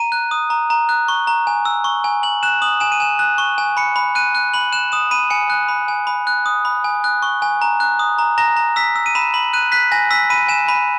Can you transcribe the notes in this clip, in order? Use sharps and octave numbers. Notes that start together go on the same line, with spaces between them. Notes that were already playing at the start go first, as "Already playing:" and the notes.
Already playing: A#5 D#7
F#6
D#6
A#5
A#5
F#6
C#6
A#5
G#5
E6
C#6
G#5
G#5 F#7
F#6 E7
D#6 F#7
G#5 E7
D#7
G#5 E7
F#6
C#6
G#5
B5 C#7
B5
F#6 D#7
F#6
B5 F#7
F#6 E7
D#6 E7
B5 D#7
G#5 C#7
F#6
B5
G#5
B5
F#6
D#6
B5
G#5
F#6
C#6
G#5
A#5
F#6
D#6
A#5
A#5 A#6
A#5
E6 B6
E6
D#7
B5 E7
B5 F#7
F#6 D#7
F#6 B6
G#5 A#6
E6 B6
B5 D#7
G#5 E7
B5 D#7